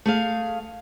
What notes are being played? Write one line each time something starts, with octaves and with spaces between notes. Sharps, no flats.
A3 G#4 F5